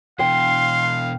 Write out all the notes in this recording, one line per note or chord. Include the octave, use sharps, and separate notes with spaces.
B2 E3 F5 G5 C6